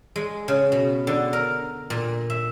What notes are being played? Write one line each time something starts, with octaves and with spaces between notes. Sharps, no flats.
G#3
C#3
B2
D3
A#4
A#2
E5